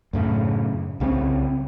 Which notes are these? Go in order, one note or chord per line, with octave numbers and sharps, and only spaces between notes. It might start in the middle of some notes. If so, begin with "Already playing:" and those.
F#2 A2 C#3
C2 C#3 F#3 C4